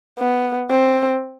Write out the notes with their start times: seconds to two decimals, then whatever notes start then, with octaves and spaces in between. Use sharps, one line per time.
0.19 B3
0.70 C4